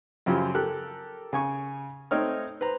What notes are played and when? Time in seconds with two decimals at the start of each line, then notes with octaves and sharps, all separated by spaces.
0.26 F#2 C#3 F3 F#3 G4 C5
0.55 G4 A4 A#4 F#6
1.33 C#3 G#5 C#6
2.11 A3 C4 D#4 C#5 F6
2.61 B4 C5 A#5